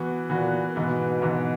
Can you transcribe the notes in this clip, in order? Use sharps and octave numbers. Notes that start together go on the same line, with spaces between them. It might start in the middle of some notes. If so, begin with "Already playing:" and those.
Already playing: E3 B3 F#4
A#2 E3 B3 F#4
G#2 B2 E3 B3
G#2 E3 B3